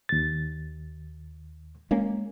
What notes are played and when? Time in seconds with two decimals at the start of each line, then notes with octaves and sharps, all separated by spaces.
0.09 D#2 A6
1.91 G#3 A#3 C#4